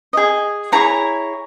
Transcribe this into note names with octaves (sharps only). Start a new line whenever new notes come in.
G#4 D#5
E4 G#4 C#5 A#5